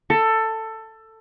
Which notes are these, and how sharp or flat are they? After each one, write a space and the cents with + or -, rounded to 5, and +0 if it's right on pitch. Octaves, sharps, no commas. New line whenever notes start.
A4 +15